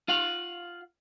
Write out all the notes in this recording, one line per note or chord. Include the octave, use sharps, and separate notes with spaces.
F4 F5 F#5